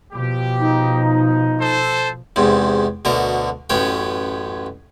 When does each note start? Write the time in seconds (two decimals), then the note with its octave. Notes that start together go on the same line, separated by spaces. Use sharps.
0.12 B2 F3 G4
0.60 D#4
1.59 A4 C5
2.36 E2 G#2 C3
3.05 D2 B2 D3 A#4
3.70 A1 F#2 B3 C#5 G5